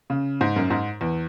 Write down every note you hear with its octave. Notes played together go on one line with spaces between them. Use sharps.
C#3
G#2
F#2
G#2
E2